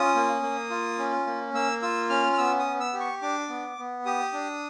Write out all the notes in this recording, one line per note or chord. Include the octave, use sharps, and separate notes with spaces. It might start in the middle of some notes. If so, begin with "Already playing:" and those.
Already playing: C#4 F4 D#6
A#3
A#3
F4
C#4
A#3
A#3 E6
F4 E6
C#4 F6
F6
B3 E6
D#6
B3
E6
G4
C#6
D4 D6
B3
B3
G4 D#6
D4